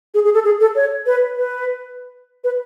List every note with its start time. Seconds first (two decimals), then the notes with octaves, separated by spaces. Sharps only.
0.14 G#4
0.25 G#4
0.34 A4
0.45 G#4
0.60 A4
0.76 C#5
1.06 B4
1.37 B4
2.44 B4